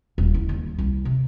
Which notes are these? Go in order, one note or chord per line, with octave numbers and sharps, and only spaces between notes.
D#1
E4
D#2
C2
C3